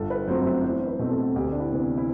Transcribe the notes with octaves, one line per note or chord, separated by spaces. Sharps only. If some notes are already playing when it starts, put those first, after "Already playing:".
Already playing: G1 A4
B4
F#2 F#3 A3 C4 C5
E5
E2 C5
B4
B2 A3 C4
A4
D2 G4
D4
E4
C3 E3 B3
E4